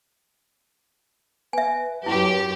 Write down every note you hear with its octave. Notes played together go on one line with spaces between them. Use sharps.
B4 E5 G#5
F#2 E4 G4